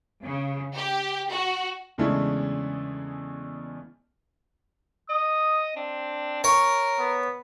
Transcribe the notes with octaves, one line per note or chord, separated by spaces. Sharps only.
C#3
G4
F#4
E2 C#3 G#3 A3 D4 E4
D#5 D#6
C4 D4
A#4 C#5
B3